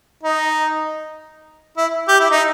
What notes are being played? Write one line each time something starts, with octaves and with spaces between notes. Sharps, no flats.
D#4
E4
G4
E4
D#4